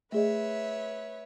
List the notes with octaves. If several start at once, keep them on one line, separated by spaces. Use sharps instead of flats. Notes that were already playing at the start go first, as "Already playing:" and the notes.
A3 G#4 B4 C#5 D#5 E5